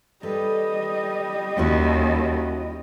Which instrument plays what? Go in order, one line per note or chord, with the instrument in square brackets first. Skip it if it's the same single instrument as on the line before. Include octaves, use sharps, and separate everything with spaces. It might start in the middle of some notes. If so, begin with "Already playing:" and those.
[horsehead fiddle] G3 D#5 [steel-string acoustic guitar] A4 B4
[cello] D#2 [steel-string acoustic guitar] C#4 E4 F#4